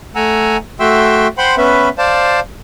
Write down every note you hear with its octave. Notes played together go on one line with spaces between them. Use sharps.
A3 F#5 G#5 A#5 E6
A3 F#4 E5 G5 C6 E6
C5 F#5 G5 B5 C6
B3 C#4 B4 E5
C5 D5 F5 A5